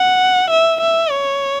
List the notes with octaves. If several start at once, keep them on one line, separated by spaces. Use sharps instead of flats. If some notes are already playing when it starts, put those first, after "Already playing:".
Already playing: F#5
E5
E5
C#5